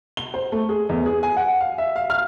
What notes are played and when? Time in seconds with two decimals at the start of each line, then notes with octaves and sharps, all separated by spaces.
0.17 G7
0.34 C5
0.52 A3
0.69 G#4
0.89 E2
1.06 G#4
1.23 G#5
1.37 F#5
1.61 F5
1.78 E5
1.96 F5
2.10 F6